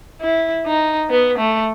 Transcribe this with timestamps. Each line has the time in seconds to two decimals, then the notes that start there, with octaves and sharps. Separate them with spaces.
0.21 E4
0.66 D#4
1.10 B3
1.38 A3